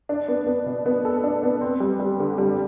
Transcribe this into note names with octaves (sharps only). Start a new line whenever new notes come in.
D4
B3
B3
B2
B3
A4
D4
B3
C4
G3
G3
D3
G3